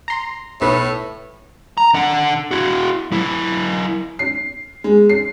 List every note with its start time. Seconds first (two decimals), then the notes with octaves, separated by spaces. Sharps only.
0.08 A#5 C6
0.61 B1 A2 B4
1.77 A#5
1.94 D3 F#5
2.51 E4 F#4
3.11 F#3 E4
4.19 C7
4.84 G#3
5.10 C7